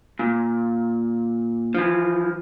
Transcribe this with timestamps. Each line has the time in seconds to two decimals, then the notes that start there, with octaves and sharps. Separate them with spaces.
0.19 A#2
1.75 E3 F3